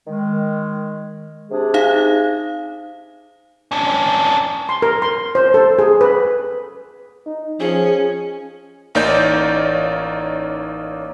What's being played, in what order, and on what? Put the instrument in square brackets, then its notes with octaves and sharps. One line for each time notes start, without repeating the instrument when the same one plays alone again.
[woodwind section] D#3 G#3
C3 D4 G#4
[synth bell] D#4 F5
[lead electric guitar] C#4 D4
[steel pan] C6
A#4
C6
C5
A4
G#4
B4
[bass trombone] D#4
[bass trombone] F3 [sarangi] C#4 [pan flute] G#4
[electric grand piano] A1 A#3 D#4 C#5 D5 G6